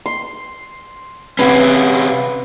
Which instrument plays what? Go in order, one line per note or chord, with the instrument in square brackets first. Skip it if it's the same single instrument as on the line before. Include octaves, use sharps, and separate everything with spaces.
[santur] C6
[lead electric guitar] C3 C#4 [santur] B4 F#5